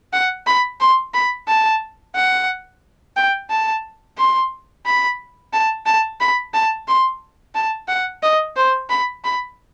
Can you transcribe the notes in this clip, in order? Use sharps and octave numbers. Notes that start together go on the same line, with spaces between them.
F#5
B5
C6
B5
A5
F#5
G5
A5
C6
B5
A5
A5
B5
A5
C6
A5
F#5
D#5
C5
B5
B5